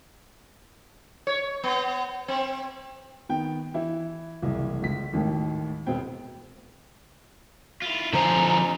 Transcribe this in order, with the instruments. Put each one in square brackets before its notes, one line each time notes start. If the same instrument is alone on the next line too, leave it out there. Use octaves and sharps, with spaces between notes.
[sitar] C#5
B3
C4
[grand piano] D#3 B3 G5
E3 E4
F#1 C2 E3
G1 C#2 B6
G#1 D#2 A2
E1 B2 G#3 B3 C4 G5
[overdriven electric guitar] E4 F4
[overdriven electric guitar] F2 G#5 [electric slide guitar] D3 F3 C5 [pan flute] A#5